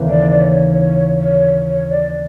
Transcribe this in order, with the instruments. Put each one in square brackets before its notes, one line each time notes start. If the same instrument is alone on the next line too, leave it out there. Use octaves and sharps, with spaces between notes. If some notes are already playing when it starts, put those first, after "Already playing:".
Already playing: [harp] D#2 C#3 E3 A3 C4
[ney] D5
D5
C#5
C#5
C#5
C#5
D5